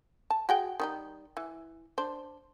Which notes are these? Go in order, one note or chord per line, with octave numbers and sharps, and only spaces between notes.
A5
F#4 G#4 G5
D#3 G3 D#4
E3
D4 C5